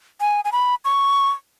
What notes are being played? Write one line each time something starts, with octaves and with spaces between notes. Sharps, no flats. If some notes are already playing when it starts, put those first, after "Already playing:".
G#5
G#5
B5
C#6